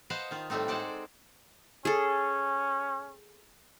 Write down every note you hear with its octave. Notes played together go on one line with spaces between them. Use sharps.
B4 C5 D#5 F5 F#5 A5
D#3 F4
A2 G3 A3 C4 D#4
G#3 D#4 A4 C5 D5 F#5
C#4 G#4 A4